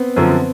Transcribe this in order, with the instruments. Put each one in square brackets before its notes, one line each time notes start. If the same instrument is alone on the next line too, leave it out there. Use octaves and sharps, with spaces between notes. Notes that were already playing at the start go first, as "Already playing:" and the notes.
Already playing: [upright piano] B3 C4
[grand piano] F#2 D3 F3 [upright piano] C4